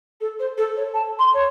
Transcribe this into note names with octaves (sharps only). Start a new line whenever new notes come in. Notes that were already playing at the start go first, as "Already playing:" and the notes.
A4
C5
A4
C#5
A5
C6
C#5